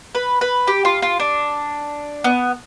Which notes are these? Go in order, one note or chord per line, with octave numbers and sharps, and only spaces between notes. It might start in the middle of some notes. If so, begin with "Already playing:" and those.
B4
B4
G4
F4
F4
D4
B3